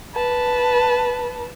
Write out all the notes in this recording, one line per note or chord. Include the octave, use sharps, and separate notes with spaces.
B4 A5